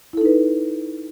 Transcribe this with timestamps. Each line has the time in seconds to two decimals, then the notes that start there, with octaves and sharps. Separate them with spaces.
0.13 E4
0.17 A4
0.21 D#4
0.25 B4